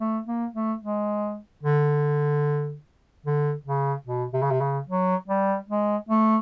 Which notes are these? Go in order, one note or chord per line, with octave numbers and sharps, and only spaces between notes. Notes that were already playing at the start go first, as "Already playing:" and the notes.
A3
A#3
A3
G#3
D3
D3
C#3
B2
C3
C#3
C3
C#3
F#3
G3
G#3
A3